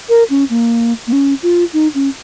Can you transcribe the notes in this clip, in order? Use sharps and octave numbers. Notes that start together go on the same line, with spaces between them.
A#4
C#4
A#3
A#3
C#4
F4
D#4
C#4